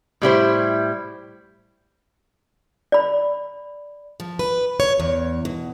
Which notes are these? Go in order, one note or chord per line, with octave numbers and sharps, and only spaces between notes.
A2 G3 E4 C5
D5 B5
F3
B4
C#5
E2
B2